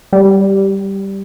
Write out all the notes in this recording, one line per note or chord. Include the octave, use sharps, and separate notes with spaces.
G3